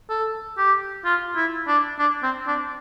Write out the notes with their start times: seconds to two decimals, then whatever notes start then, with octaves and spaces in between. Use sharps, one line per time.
0.10 A4
0.58 G4
1.05 F4
1.36 E4
1.68 D4
1.99 D4
2.23 C4
2.47 D4